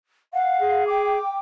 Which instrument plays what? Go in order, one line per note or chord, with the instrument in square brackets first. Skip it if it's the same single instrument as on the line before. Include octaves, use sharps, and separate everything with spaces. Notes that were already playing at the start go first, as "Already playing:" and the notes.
[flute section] F5 [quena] F#5
[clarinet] G#4
[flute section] G5 [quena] D6